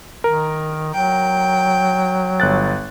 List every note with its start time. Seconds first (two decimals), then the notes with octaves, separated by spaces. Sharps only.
0.24 D#3 A#4
0.94 F#3 G5
2.40 G1 F#6 A6